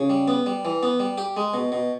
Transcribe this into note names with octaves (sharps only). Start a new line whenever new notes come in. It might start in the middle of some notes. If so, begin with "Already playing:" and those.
Already playing: C#3
G3
B3
G3
E3
B3
G3
G4
G#3
B2
B2